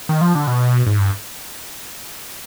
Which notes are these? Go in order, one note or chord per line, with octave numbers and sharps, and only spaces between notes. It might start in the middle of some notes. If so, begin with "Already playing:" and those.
D#3
F3
D3
B2
G#2
G2